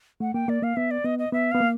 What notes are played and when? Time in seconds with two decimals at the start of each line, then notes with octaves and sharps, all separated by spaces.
0.20 A3 F#5
0.34 A#3 G5
0.48 A#3 D5
0.62 A#3 F5
0.76 B3 E5
0.91 D5
1.04 B3 D#5
1.19 D#5
1.32 B3 E5
1.51 B3 F5
1.60 A#3